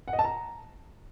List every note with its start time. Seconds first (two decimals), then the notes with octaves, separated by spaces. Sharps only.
0.08 F#5
0.13 D#5
0.19 A5
0.24 A#5